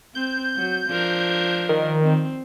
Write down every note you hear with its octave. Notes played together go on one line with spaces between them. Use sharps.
C4 G6
F#3
F3 D4 A#4
D#3
C4